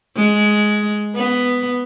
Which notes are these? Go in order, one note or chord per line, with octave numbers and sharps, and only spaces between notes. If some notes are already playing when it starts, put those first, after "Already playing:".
G#3
B3